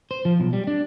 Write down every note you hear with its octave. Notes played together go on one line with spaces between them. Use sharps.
C5
F3
B1
G3
D4